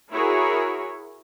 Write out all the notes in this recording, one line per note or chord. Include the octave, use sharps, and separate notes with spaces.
E4 F#4 G#4 A#4 C#5